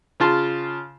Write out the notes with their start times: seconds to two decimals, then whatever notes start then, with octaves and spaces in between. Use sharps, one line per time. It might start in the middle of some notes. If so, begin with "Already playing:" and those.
0.20 C#3 F4 A5 C6